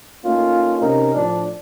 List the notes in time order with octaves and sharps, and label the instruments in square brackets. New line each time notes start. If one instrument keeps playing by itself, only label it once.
[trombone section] A3 A#3 C#4 D#4 F4
C3 C#4 D#4 A#4
A2 F3 D4